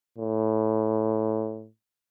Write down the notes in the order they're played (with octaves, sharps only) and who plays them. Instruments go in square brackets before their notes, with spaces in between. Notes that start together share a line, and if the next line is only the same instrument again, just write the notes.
[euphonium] A2